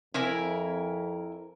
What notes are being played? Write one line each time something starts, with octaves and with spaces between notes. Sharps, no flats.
F2 C4 E4 A#4 G#5